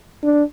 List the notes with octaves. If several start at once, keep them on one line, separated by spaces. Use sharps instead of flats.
D4